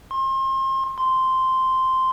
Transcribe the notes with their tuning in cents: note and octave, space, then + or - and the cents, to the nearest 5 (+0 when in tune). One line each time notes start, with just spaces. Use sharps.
C6 +35
C6 -5